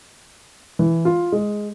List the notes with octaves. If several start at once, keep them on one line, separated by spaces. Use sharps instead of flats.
E3
F4
G#3